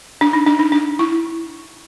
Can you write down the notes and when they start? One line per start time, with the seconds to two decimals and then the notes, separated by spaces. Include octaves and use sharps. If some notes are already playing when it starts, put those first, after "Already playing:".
0.21 D4
0.33 D#4
0.46 D4
0.59 D#4
0.72 D4
0.99 E4